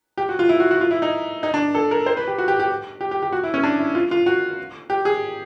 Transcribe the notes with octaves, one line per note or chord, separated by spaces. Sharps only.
G4
F#4
F4
E4
F#4
F#4
F4
E4
D#4
D#4
D4
A4
A#4
C5
B4
G4
F#4
G4
G4
G4
G4
G4
F#4
E4
C#4
D4
E4
F4
F4
F#4
G4
G#4